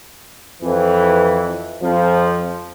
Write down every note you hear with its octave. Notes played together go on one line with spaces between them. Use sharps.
F2 E3
F2 F3